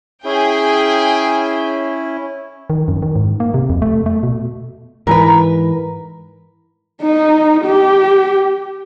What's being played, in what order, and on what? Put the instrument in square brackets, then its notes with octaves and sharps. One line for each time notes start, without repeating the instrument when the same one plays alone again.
[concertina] C#4 E4 [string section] G#4 G5
[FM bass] D#3
F#2
D#3
G#2
A#3
C3
F2
A3
A3
B2
[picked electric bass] G#2 E3 [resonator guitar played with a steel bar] A#4 B4
[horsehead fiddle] D#4
G4